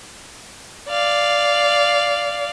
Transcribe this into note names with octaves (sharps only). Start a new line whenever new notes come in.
D5 F5